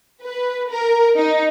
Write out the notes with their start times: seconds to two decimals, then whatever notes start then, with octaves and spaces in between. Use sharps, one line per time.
0.23 B4
0.70 A#4
1.17 D#4